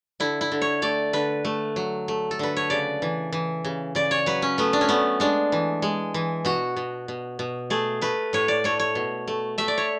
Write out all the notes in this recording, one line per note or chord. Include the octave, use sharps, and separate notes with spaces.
D3 E4
E4
D3
C#5
A3 D5
D3 B4
A3
F#3
A3
A4
D3 B4
C#5
C#3 D5
E3
E3
C#3
C#3 D5
C#5
F#3 B4
C#4
A3 B3
D4
C#4
A3 B3
G#3 D4
E3
G#3
E3
B2 F#4
B2
B2
B2
A3 G#4
A3 B4
A2 C#5
D5
A3 C#5
C#5
B2
A3
A3 E5
D5
C#5